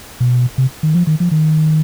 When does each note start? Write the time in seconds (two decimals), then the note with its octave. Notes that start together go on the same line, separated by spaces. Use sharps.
0.20 B2
0.58 C3
0.83 D#3
0.95 F3
1.07 D#3
1.20 F3
1.31 D#3